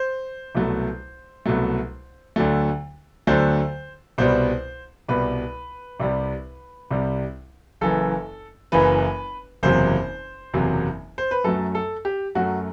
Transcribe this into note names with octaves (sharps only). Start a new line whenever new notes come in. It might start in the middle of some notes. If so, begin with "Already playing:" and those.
Already playing: C5
C2 B2 F#3 A3
C2 B2 F#3 A3
D2 D3 F#3 A3
D2 D3 F#3 A3 C5
C2 B2 G3 C5
C2 B2 G3 B4
C2 C3 G3
C2 C3 G3
F#1 F#2 E3 A4
F#1 F#2 E3 B4
F#1 E2 C3 F#3 C5
F#1 E2 C3 F#3
C5
B4
F#2 F#3 A3 A4
A4
G4
F#2 F#3 A3 F#4